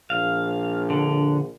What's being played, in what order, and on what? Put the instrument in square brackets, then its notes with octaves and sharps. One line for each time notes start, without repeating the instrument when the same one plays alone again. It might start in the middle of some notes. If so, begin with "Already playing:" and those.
[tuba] A#1 [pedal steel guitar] F5
[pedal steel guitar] D3